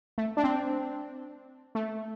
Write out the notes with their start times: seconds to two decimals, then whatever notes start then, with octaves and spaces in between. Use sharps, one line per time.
0.18 A3
0.37 D4
0.44 C4
1.75 A3